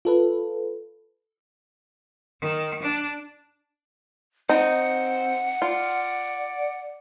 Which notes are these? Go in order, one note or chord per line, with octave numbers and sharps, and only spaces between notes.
F4 A4 B4
D#3
D4
C4 D#4 F#5
F4 D5